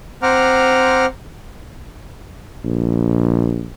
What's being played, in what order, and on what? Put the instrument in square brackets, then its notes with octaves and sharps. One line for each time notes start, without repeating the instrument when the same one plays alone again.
[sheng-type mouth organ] C4 C5 F#5 A#5 D6 F6
[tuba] A#1